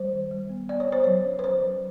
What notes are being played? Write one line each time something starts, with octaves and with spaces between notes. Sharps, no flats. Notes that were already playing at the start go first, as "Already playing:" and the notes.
Already playing: G3 C5
D#3
G3
B3
B3 D5
C#5
B3 C5
F#3 C#5
C#4
B4
F#3 C5
F#3